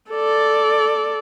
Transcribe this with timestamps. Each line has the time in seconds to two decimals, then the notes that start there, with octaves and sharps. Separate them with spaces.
0.11 A4 D5